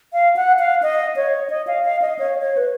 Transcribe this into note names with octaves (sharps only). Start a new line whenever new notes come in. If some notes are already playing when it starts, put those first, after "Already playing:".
F5
F#5
F5
D#5
C#5
D#5
F5
F5
D#5
C#5
C#5
B4